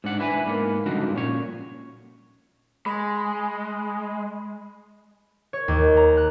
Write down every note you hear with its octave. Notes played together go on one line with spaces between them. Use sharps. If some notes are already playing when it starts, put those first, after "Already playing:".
G#2 D4 F#5
D4 E4 B4 G#5
G#2 A#3 B3
C#2 G2 D3 F3 D#4 F#4
A#2 C#4 C#5
G#3 B5
C#5
D#2
A#5
F#6